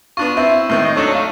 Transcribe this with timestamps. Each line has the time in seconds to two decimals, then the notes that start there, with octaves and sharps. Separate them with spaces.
0.17 B3 D4 F4 C#6
0.37 C4 E4 E5
0.70 A2 D#3 C4
0.84 D#5
0.96 F#3 D4 D#4 A4 C#5
1.14 A3 F5